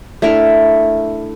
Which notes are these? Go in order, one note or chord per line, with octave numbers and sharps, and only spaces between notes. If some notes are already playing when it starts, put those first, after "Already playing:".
A3 D4 E4 A#4